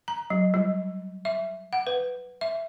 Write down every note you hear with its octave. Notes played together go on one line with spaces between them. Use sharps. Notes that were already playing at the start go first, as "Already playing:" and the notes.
A#5
F#3
G3
E5
F#5
B4
E5